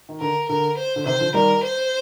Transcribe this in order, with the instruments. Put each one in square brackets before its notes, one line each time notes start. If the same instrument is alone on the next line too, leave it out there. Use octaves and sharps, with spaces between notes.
[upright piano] D#3
[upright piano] D3 [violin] A#4
[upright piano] D3 [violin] A#4
[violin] C5
[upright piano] D3
[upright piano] C3 D#3 [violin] C5
[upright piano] D3 F3
[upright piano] D#3 G3 [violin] A#4
[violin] C5